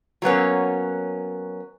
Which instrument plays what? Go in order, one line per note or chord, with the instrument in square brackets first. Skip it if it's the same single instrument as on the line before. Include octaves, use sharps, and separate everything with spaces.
[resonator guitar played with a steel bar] F#3 A#3 B3 C#4